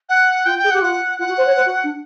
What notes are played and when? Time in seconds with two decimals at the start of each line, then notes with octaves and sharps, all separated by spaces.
0.09 F#5
0.45 F4 G5
0.58 G5
0.64 G#4
0.70 G4 F#5
0.82 F4 F#5
1.19 F4 F#5
1.29 F#4
1.38 C5
1.46 C#5
1.56 C5
1.66 F#4
1.83 D4